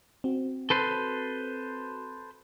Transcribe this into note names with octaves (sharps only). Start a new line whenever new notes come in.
C4 F#4
A4 B4 C5